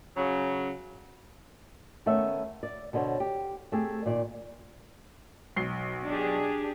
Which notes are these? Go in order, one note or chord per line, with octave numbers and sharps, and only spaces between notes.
C#3 F#3
D#3 A3 B3 C#4 E5
D5
B2 D3 C5 C#5
G4
A3 C4 G4 G#4
A#2 D#3 D5
B1 C7 G7
D4 G4 G#4